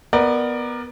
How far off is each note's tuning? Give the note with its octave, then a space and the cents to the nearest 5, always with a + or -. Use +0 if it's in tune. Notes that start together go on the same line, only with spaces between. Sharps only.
B3 +0 A#4 +10 D5 +25